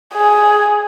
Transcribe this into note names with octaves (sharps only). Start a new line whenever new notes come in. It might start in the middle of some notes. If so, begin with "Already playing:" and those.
G#4